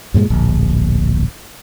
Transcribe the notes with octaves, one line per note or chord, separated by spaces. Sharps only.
G2 A#2 E3 G#3
D1 A#1